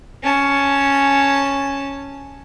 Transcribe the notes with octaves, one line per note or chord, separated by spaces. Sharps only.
C#4 A5